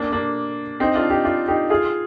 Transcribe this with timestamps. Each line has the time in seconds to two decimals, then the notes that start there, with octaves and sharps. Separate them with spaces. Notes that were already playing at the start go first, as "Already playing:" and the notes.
Already playing: A#3 D4
0.12 A#3 D4
0.80 C4 D#4
0.95 D4 F4
1.10 D#4 G4
1.24 D4 F4
1.48 D#4 G4
1.70 F4 G#4